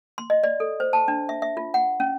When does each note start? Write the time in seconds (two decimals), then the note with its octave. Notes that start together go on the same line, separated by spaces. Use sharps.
0.18 C6
0.30 D#5
0.44 D5
0.60 A4
0.80 C5
0.93 A5
1.08 D4
1.29 E5
1.42 E5
1.57 F4
1.74 F#5
2.00 C#4